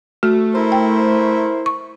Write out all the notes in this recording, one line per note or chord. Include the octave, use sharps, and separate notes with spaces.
A3 F#4
E4 A#4 C5
G5
C#6